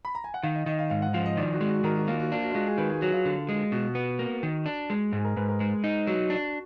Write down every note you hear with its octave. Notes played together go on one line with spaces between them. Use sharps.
B5
A#5
G#5
F#5
D#3 F5
D#5
D#3 D#5
F5
G#2 F5
F#5
F3 F5
D#5
D#3 D5
F#4
G#3
F#4
D#3 A#4
F#4
A#3 F4
F#4
D4 F4
F#4
F4
G#3 F#4
G#4
D#3 B4
G#4
F#3 F#4
F4
D3
G#3
B2 F#4
B3
A#3
D#3
D4
G#3
G#2 G#4
A#4
G#2 B4
A#4
G#3
D#4
F#3 F#4
D4